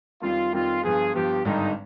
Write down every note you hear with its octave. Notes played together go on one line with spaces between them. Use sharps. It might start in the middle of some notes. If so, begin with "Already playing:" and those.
F2 D#3 G3 C4 F4
F2 D#3 G3 C4 F4
G2 F3 B3 G#4
G2 F3 B3 G4
G#1 G2 D3 G3 D#4